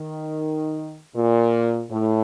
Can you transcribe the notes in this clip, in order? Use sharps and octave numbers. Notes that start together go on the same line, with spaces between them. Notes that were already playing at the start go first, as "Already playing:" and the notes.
Already playing: D#3
A#2
A2